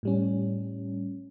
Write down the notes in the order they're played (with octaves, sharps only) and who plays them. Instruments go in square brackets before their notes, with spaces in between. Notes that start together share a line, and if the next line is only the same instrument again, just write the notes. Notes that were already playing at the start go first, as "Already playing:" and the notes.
[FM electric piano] A2 G3 C#4